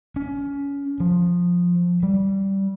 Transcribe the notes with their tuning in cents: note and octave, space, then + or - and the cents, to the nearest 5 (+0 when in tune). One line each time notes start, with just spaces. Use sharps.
C#4 +25
F3 +15
G3 -10